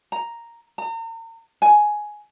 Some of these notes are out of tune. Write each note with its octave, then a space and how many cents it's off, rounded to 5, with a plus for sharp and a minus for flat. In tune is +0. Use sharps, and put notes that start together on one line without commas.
A#5 +0
A#5 -40
G#5 +10